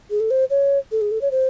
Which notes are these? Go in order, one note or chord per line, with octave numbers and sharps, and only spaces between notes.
G#4
A4
C5
C#5
A4
G#4
A4
C#5
C5